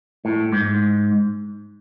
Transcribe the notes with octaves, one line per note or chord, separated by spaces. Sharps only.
A2
G#2